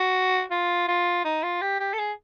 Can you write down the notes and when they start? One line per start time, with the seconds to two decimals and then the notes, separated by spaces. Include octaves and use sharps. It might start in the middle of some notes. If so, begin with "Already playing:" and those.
Already playing: F#4
0.51 F4
0.88 F4
1.25 D#4
1.43 F4
1.61 G4
1.80 G4
1.94 A4
1.99 G#4